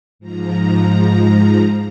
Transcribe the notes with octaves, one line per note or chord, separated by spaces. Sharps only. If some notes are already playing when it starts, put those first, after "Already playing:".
G#2 F3 A#5